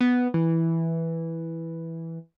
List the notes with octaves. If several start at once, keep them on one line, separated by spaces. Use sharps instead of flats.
B3
E3